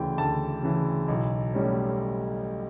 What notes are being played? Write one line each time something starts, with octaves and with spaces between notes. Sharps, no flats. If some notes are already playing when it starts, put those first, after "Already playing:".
Already playing: D2 C#3 E3 G5
D2 A5
C#3 E3
B1
A2 G3 C#4